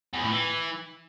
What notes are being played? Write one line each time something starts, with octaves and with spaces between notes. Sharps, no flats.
E2
A2
E3